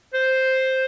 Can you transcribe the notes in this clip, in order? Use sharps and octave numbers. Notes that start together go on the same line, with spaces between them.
C5